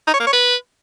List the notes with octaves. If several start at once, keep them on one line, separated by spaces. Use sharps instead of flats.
D#4
C#5
A#3
C#5
B4